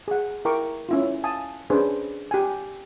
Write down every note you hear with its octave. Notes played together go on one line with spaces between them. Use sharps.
G#4 F#5
E4 A#4 G5 A#5 C#6 D6
C#4 E4 F4
F5 G#5 A5 D#6
C#4 D4 G#4 B4 C5
G4 G5 G#5